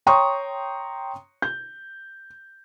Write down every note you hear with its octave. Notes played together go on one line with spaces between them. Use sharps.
C#5 G5 A#5 C6 C#6 D#6
G6